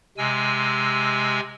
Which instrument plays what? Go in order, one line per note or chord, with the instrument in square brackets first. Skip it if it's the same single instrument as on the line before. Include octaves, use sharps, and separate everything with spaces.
[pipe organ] C3 G#3 G#5 E6